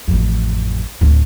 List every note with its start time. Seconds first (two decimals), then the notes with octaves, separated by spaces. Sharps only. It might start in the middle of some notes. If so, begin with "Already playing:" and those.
0.08 A1 F2
1.01 D2 A2